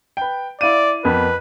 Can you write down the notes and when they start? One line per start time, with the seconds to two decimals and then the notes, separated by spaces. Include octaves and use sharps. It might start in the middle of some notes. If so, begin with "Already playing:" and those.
0.17 B4 G5
0.61 E4 D5 F5 D#7
1.05 F2 B3 A#4 B4